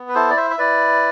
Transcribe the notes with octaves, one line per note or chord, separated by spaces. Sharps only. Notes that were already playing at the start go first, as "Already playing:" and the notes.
Already playing: B3
B4
E4 A4 C5
D5
C5 E5
E5
E4 B4 D5